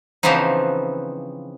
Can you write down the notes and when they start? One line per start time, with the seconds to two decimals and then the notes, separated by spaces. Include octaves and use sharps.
0.23 C#3 E3 F3 B3 C4 D#4